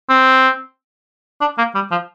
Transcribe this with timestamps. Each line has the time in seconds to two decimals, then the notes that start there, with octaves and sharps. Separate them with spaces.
0.09 C4
1.41 D4
1.58 A#3
1.75 G3
1.91 F3